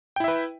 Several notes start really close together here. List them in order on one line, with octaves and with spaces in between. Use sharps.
G5 E4 E5 B4